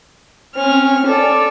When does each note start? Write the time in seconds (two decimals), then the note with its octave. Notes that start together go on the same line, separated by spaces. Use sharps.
0.56 C4 C#4 F6
1.07 A4 D5